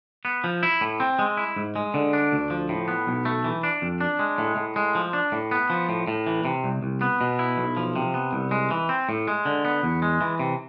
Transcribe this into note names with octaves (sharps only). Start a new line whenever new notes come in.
B3
F3
E4
A2
C4
G#3
E4
G#2
G#3
D3
D4
D2
F3
A2
B3
B1
A3
E3
D4
F2
D4
G#3
A2
A2
G#3
F3
D4
A2
B3
F3
A2
A2
E3
C3
C2
C2
B3
B2
E4
B1
F3
C3
B3
C2
G#3
E3
C4
A2
G#3
D3
B3
E2
G#3
E3
C3